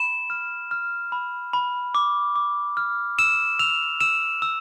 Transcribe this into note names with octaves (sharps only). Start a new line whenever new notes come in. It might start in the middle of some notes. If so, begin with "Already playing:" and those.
Already playing: B5 E7
F6
F6
B5
B5
D6
D6
F6
E6 E7
E6 F7
E6 E7
E6